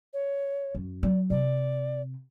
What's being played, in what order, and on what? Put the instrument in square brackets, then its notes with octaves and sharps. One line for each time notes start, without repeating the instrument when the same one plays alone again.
[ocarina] C#5
[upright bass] F#2
[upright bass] F#3 [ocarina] D5
[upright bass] C3 [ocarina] D5